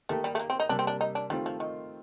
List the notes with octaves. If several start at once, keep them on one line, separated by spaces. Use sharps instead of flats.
D#3 A3 A#3 D#4 G4
G3
A3
A#3
C4
D#4
C3 G3 A#3 D4
C4
D4
D#4
D4
D#3 G3 A3 C4 F4
F3
D#3